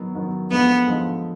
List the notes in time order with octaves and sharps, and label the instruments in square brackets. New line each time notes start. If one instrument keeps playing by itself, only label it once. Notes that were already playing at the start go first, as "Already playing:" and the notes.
Already playing: [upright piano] D#3 F#3 B3
D#3 F#3 B3
[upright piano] D3 F3 G#3 D#4 [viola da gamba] B3
[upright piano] D3 F3 G#3 D#4